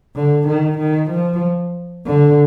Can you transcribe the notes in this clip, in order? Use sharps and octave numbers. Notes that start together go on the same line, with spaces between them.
D3
D#3
D#3
F3
D3